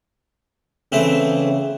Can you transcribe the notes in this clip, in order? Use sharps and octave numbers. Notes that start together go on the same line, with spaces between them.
C#3 E3 A3 C4